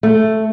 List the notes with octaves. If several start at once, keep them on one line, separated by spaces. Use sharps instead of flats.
A3